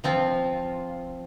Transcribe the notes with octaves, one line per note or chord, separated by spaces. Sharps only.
F3 C4 F4